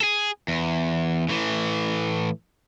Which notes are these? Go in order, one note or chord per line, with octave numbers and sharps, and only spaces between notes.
G#4 A4
E2
A2 E3